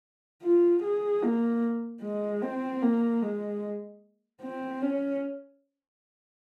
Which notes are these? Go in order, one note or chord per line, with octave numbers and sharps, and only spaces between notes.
F4
G#4
A#3
G#3
C4
A#3
G#3
C4
C#4